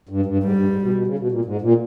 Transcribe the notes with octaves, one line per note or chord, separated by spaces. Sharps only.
G2
G2
G#2 G3
G2
G#2
B2
B2
C#3
B2
A#2
G#2
A#2